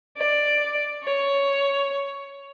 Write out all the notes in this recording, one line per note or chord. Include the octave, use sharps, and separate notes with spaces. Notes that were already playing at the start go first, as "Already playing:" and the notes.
D5
C#5